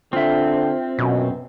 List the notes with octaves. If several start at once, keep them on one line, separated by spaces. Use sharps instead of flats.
D3 C4 F4 E5
F#2 B2